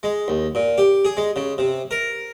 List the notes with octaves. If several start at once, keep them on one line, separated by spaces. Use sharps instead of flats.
G#3
D#2
A#2
G4
G#4
G#3
C#3
C3
A#4